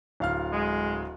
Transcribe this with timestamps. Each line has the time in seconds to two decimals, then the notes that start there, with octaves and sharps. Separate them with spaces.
0.20 D1 F5 F6
0.52 G#3